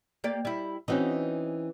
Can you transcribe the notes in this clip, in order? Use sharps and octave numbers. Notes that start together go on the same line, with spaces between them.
A#3 G4 D5
G3 E4
E3 C4 C#4 D#4 F#4